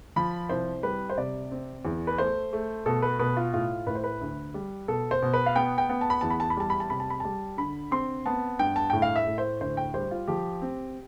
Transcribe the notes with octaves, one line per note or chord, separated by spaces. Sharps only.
F3 B5
C2 C5
G3 B4
C5
C3 D5
C4
E2
B4
A3 C5
A3
B2 A4
B4
B2 B4
F4
A2 F4
A2 B4
C5
B4
D2
G3
B2 A4
C5
B2
B4
F5
B3 G5
G5
B3
A5
B5
E2 A5
B5
A5
B5
G3 A5
B5
A5
C3 B5
A5
B5
G3 A5
D3 B5
C4 C6
B3 A5
G2 G5
A5
A2 G5
F5
E5
A2
C5
D2 C5
G5
G3 C5
F4
F3 G4
C4